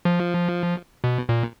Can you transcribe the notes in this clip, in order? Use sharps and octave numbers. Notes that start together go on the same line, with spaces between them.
F3
B2
A#2